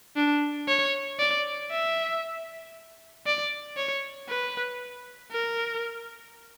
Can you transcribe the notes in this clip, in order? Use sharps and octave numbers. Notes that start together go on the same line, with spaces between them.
D4
C#5
D5
E5
D5
C#5
B4
A#4